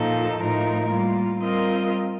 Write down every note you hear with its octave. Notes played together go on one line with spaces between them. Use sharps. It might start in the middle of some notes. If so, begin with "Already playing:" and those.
Already playing: A#2 F3 A#3 D#4 A4
A2 F3 A3 D#4 A#4
G3 A#3 F4
G3 C4 F4 A#4 D#5